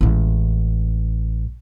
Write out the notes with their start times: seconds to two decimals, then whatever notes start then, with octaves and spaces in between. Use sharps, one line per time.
0.01 A1 G#3